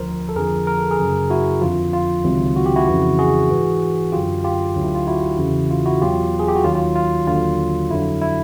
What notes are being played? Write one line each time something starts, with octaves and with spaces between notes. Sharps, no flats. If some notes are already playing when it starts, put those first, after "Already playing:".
Already playing: D2 D3 F3 A#4 C5
A4
F2 D3 F3 G#4 A#4
A#4
A4
G#4 A#4
F#2 C#3 F#3
E4 F#4
F2 D3 F3 F4
F4
C#2 C3 D#3 F#3
F#4
G4
E4 F#4
F2 C#3 E3
F#4 G#4
G#2 E3
F#2 D3 F#3 F4 G4
F4 G4
D2 D3 F#3
E4
F4
E4 F#4
E2 C#3 E3
F4
E4 F#4
E2 B2 F#3 F4 G4
G#4
G4
F#4
D#2 D#3 F#3 F4
F4
F4
D#2 D3 F#3 F4
F2 D3 F#3 E4
E4